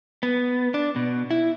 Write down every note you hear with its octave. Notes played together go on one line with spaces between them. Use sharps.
B3
D4
B2
E4